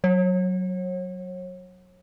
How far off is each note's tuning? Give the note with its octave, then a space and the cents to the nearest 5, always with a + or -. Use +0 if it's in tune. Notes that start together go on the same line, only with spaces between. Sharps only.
F#3 +0 C#5 -35